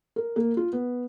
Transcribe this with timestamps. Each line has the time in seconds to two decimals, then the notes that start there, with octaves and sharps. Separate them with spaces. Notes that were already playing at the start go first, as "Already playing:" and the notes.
0.16 A#4
0.36 A#3
0.57 F4
0.73 B3